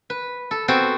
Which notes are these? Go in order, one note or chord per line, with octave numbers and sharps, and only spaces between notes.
B4
A4
B3 C4 F#4 G#4 A4 C5